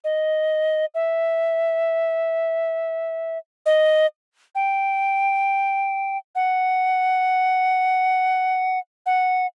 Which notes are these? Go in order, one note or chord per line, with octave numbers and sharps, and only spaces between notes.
D#5
E5
D#5
G5
F#5
F#5